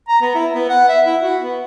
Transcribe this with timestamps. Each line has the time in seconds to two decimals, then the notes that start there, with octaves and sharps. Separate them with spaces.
0.09 A#5
0.22 B3
0.35 E4
0.54 B3
0.70 F#5
0.89 E5
1.06 E4
1.23 F#4
1.42 B3